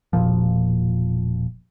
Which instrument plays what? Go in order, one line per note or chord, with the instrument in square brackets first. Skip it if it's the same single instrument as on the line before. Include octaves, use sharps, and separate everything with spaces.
[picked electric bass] E1 A#2 F3